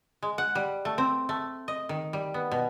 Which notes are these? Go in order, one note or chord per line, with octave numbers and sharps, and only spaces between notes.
G#3
F#5
G3
A3
C4
A3
D#5
D#3
G3
B3
B2